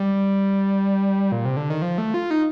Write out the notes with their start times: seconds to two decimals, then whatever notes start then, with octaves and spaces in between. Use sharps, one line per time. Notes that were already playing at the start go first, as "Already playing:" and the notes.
Already playing: G3
1.32 A#2
1.45 C3
1.57 D3
1.70 D#3
1.82 F3
1.98 A3
2.14 F4
2.31 D#4